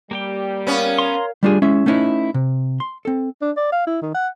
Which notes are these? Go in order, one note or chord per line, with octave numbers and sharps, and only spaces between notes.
G3 A#3 G4 G5
B3 C#4 A#4 C#5 F5
A#5 C6
G3 A3 D4 F4 G4 G#4
G#3 C#4 E4 E5
A3 B3 C#4 D#4 E4 B4
C3
C6
C4 A4
D4
D5
F5
E4
D#3
F#5